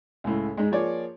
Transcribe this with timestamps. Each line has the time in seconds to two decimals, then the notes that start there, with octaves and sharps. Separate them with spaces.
0.24 C#2 A2
0.57 G#2 G#3
0.72 F3 A#3 G#4 C#5 D5